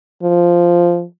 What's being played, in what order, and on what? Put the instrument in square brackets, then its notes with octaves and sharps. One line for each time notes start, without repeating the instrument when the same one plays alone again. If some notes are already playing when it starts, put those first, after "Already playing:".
[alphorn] F3